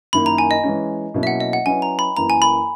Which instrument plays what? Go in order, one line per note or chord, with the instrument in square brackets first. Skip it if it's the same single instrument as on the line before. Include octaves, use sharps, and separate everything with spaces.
[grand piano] F#2 D#3 A#3 E4 [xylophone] B5
[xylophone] A#5
G#5
D#5
[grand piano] E3 G#3 C#4
B2 F#3 A#3 C#4 E4
[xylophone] E5
F#5
D#5
F#5
[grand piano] F#3 C#4 E4 B4 D#5 [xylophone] G#5
[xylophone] A#5
B5
[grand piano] F#2 E3 A#3 E4 [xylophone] A#5
[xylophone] G#5
B5